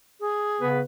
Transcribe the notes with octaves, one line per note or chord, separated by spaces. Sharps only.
G#4
C#3 B3 B4